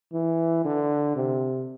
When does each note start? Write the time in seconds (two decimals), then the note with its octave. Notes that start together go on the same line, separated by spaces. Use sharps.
0.13 E3
0.64 D3
1.16 C3